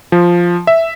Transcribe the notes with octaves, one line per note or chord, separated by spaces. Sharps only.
F3
E5